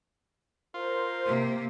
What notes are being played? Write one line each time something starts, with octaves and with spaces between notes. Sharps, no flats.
F4 A#4 C5
C3 A#3